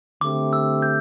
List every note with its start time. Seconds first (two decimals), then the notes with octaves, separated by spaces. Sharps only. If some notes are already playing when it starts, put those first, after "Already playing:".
0.21 D3 A3 C4 G4 D6
0.53 E6
0.82 G6